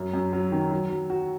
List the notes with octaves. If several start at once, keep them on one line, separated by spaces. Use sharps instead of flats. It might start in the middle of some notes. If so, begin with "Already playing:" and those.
Already playing: F#2
F#2
F#3
D#3
F#3
F#3
F#4